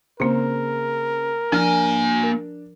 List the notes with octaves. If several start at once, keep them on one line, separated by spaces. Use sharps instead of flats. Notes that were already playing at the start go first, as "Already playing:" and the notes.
C#3 A#3 C4 A#4 C5
F3 A#3 D4 G#5 F6
A#4